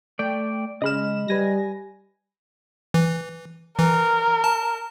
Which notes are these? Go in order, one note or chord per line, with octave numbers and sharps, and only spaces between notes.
A3 D5 G5
C#3 G#3 D#5 B5 F6 E7
G3 B4 G#5 A#6
E3
E3 A#4
A5